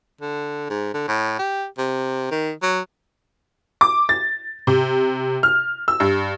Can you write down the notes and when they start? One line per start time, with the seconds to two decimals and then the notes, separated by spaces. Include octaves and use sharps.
0.21 D3
0.70 G#2
0.94 D3
1.08 A2
1.39 G4
1.78 C3
2.31 D#3
2.62 F#3
3.81 D6
4.09 A6
4.67 C3
5.43 F6
5.88 E6
6.00 G2